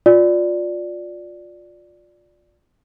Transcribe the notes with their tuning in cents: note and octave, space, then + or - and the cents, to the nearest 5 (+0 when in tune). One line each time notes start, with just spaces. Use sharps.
F4 +25 D5 +0